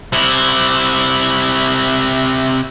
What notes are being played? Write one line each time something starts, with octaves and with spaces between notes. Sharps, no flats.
C3 E4